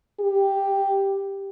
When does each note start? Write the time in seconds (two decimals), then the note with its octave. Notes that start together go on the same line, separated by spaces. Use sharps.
0.20 G4